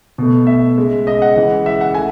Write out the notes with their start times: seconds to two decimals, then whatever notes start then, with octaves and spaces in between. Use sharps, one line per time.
0.18 B2 A3
0.47 E5
0.77 C#3 G#3
1.07 D#5
1.22 F#5
1.36 C#3 E3 G#3
1.66 E5
1.81 F#5
1.94 A3 G#5